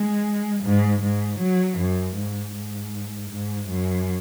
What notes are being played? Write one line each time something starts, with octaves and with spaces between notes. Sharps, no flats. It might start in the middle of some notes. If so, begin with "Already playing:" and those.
Already playing: G#3
G#2
G#2
F#3
F#2
G#2
G#2
G#2
F#2